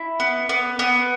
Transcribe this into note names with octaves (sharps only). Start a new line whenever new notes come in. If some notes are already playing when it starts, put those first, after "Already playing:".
Already playing: E4
B3
B3
B3